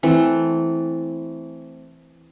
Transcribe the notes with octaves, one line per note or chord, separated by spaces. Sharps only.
E3 A3 C4